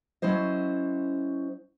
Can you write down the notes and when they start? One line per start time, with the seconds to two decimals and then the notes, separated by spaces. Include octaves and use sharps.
0.22 F#3 C#4 E4 C5 D#5